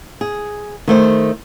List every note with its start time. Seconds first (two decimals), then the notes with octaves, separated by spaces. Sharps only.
0.21 G#4
0.88 D#3 A3 C5